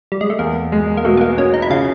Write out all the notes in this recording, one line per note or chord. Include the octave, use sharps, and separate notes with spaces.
G3
G#3
A3
E2 A#3
G#3
A#3
B2 A3
B3
A#3
B2 C#4
D#4
E4
C#3 F4